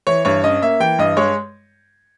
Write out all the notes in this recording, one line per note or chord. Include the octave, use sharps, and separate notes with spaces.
E3 C#5
G2 C#5
C#4 D#5
A#3 E5
E3 G5
G2 D#5
G#3 C#5